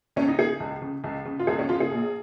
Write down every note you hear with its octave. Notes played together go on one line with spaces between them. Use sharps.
C#2 C#4
D#4
C#3 G#4
C#2
C#3
C#2
C#3
F4
C#2 G#4
C#4
C#3 F4
G#4
A#1